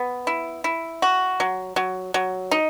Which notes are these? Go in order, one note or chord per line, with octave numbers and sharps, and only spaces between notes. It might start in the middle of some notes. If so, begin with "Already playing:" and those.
Already playing: B3
E4
E4
F#4
F#3
F#3
F#3
D#4